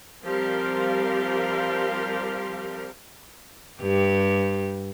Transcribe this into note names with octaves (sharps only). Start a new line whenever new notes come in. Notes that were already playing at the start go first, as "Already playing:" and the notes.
F3 G3 C4 G4 A#4 F5
G2 G4